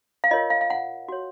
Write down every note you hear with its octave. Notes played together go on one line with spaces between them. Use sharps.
F5
F4 A#4 C#5 D#5
F5
F5
F#5
F#4 C#5